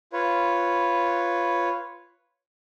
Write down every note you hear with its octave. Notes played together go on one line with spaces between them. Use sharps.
F4 B4 C#5